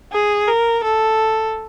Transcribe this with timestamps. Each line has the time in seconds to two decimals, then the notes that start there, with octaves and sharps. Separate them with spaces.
0.13 G#4
0.48 A#4
0.84 A4